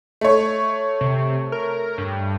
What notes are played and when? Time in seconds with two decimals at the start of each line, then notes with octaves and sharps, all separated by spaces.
0.21 A3 C#5
1.01 C3
1.52 A#4
1.98 G2